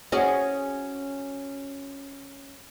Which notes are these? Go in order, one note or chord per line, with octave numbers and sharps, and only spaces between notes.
C#4 F#4 G#4